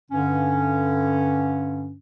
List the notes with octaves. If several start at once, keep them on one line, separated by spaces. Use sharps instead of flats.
G2 D3 C#4